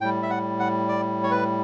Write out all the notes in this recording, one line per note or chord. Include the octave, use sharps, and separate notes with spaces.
A2 G3 G5
E5
F#5
F#5
D5
C#5
B4